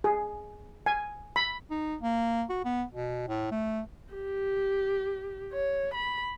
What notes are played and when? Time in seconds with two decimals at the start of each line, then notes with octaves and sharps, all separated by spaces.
0.04 G#4
0.86 G#5
1.36 B5
1.70 D#4
2.02 A#3
2.50 F#4
2.65 B3
2.92 B2
3.28 A2
3.51 A3
4.13 G4
5.53 C#5
5.94 B5